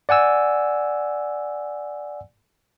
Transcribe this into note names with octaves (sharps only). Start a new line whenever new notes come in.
D5 F#5 G#5 E6